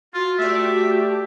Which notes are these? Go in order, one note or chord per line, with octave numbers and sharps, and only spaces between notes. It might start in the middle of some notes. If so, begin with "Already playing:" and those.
F4 F#4
A3 G4 D5 E5